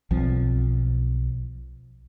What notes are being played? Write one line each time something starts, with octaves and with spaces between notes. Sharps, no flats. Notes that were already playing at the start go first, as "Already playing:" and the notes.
B1 F3 C4